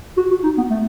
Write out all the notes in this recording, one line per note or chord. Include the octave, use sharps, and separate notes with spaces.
F#4
F#4
D#4
B3
A3